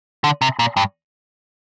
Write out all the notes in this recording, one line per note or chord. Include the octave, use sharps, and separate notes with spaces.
D3
C3
A#2
G2